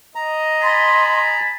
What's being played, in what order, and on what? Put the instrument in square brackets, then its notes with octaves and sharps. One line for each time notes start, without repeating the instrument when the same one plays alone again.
[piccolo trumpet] D#5 [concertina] A#5
[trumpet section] G#5 A5 B5 [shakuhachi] C6